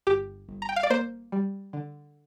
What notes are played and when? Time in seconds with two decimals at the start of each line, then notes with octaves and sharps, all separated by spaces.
0.07 G1 G4
0.49 G1
0.62 A#5
0.69 G5
0.76 F5
0.83 D5
0.90 A#3 C5
1.32 G3
1.73 D3